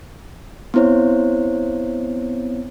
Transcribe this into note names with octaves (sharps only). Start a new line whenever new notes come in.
B3 C4 E4 C5 C#5